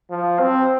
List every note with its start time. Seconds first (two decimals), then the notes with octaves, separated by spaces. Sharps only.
0.10 F3
0.40 C4